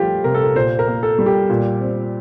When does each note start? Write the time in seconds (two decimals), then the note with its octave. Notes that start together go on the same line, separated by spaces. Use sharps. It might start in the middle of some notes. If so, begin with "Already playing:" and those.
Already playing: F3 G3 A3 F4 G4
0.24 C3 A#4
0.35 A4
0.44 A#4
0.55 A#2 C5
0.79 A#4
0.87 A#3
1.03 A4
1.19 G3
1.26 G4
1.49 A#2
1.81 C4